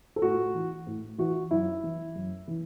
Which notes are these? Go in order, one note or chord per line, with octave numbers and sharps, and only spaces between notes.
A4
A2 F#4
E3
A2
E3 F#4
F#2 E4
E3
F#2
E3